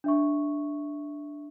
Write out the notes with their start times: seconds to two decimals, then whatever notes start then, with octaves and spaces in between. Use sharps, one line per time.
0.04 D4 E5 C#6